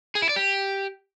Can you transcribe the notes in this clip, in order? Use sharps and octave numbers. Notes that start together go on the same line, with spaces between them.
G#4
E4
D5
G4